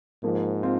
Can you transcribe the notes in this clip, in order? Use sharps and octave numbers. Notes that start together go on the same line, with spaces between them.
G#2 F3 A#3
C4 F4